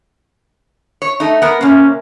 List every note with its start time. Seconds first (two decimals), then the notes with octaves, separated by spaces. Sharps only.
1.02 C#5
1.20 A3 D#4
1.42 B3 A#4
1.61 C3 A#3 C#4